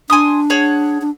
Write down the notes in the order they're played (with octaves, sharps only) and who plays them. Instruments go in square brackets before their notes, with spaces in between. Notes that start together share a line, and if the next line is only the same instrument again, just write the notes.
[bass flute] D4 [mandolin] G#5 C6 D#6
[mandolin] G#4 C#5 F#5
[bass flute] D4